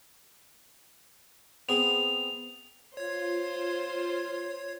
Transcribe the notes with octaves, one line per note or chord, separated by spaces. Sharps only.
B3 C4 G#4 F7
F4 C5 C#5 G#6